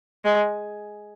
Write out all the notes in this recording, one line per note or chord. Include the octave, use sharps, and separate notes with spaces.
G#3